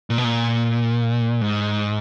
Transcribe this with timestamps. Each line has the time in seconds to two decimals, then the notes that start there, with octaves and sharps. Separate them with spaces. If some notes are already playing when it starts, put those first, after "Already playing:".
0.10 A#2
0.18 B2
0.24 A#2
1.42 G#2